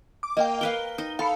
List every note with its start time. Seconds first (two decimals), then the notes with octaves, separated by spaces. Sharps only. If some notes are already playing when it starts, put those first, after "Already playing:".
0.23 D6
0.37 A#3 D#5 F5 G5
0.61 A#4 B4 F5 G7
0.98 D#4
1.19 A4 F5 B5 C#7